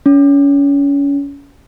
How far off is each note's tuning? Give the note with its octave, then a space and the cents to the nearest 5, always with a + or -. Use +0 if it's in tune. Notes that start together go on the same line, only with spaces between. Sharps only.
C#4 +30